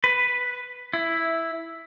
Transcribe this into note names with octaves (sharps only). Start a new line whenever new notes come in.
B4
E4